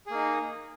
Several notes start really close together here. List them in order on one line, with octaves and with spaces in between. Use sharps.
G#4 A#3 D#4